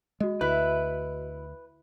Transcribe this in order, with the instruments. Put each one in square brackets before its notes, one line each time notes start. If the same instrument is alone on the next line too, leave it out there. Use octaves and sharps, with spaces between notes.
[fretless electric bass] G#3 [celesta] F#4 D#5
[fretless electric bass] D2 [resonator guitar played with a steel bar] E4 [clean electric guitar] B4